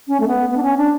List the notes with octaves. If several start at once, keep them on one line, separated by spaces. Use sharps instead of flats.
C#4
A3
B3
B3
D4
C#4
D4